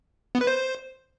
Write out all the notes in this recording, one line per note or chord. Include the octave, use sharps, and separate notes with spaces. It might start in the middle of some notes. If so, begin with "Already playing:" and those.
B3
B4
C5